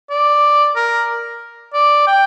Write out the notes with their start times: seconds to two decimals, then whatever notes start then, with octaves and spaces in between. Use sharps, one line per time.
0.10 D5
0.76 A#4
1.74 D5
2.07 G5